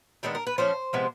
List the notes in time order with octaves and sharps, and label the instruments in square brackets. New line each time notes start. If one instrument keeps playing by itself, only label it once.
[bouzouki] D#3 G#3 B3 D4 A4
A#4
B4
F3 A3 C#4 C5
C3 F3 G#3 B3